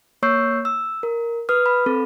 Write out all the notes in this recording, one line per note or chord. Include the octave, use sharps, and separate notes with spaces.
A#3 C#5 C#6 E6 G6 C7
E6
A#4
B4 D#6 F6
B5
C4 A4